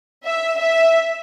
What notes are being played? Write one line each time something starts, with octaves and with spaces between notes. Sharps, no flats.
E5
E5